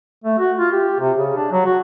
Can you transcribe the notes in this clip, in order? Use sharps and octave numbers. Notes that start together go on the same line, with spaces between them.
A3
F#4
F4
G4
C3
C#3
D4
F#3
F#4